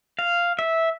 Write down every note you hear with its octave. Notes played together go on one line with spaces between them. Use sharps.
F5
E5